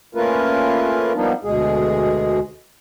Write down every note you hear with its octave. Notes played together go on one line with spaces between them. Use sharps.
A3 A#3 C#4 F4 A#4 B4
F3 G3 A#3 B3 D4 D#4
D2 B2 G#3 G#4